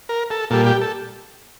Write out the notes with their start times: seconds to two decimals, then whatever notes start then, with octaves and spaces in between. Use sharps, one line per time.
0.09 A#4
0.30 A4
0.50 A#2 G3 A4
0.66 G4
0.81 A4